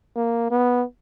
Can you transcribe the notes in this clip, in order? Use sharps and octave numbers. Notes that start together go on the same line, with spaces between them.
A#3
B3